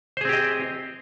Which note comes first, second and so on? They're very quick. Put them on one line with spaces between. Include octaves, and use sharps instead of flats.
C5 G#4 C4 G4 D#5